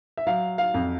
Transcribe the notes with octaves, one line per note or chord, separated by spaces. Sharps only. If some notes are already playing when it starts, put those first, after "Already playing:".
E5
F#3 F5
F5
F2